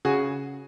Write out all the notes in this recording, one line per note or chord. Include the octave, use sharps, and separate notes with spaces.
C#3 F#4 G#4